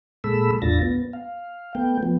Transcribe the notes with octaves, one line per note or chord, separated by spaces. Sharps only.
A#2 G#3 A4 B5 E6
E2 A2 D4 F4 A6 A#6
B3
F5
A3 B3 G5
F3 B3